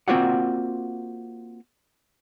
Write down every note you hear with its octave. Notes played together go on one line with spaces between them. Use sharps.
A#3 C4 F4 F#4 D5 F#5